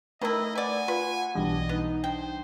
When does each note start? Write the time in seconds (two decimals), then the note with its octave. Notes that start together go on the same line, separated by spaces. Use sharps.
0.21 D#3 A3 E4 A#4 D#5
0.55 B4 D5 F#5 G#5
0.88 F4 B4
1.35 B1 E3 G3 D4 D#5
1.69 B3 D#4
2.04 D4 C5 G5